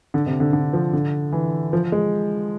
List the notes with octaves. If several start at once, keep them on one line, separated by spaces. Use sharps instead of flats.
D3
C3
D3
D3
F3
D3
E3
F3
G#3